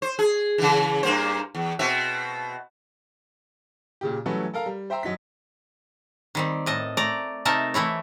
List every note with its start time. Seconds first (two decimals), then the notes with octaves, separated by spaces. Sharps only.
0.02 C5
0.19 G#4
0.58 C#3 E3
1.03 G2 A#3 C5
1.55 E2
1.79 B2 C4 E5
4.01 A#2 C#3 G4
4.26 E3 F#3 G3 A3 C#4 B4
4.54 A4 A#4 F5 A#5
4.66 G3
4.90 C5 E5 G5 A#5 C6
5.03 F#2 F#3 D#4 B6
6.35 D#3 G3 C4
6.66 A2 D#5 A5
6.97 A3 D5 A#5
7.45 C3 A3 D#4 A#4 A5
7.74 E3 A3 E4 C#5